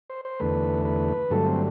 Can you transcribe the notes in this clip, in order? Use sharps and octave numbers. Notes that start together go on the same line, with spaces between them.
C5
C5
E2 D3 A3 B4
B4
G2 D3 F#3 A3 A4
C4